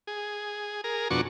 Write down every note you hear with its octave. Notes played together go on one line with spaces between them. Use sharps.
G#4
G#4 A#4
F2 B2 D4 F#4 C#6